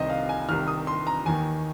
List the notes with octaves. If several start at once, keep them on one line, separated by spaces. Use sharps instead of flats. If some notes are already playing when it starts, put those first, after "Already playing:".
Already playing: C2 C3 D#3 C5 D#5
F5
G#5
C2 C3 D#3 F6
D#6
C6
A#5
D#2 D#3 G#5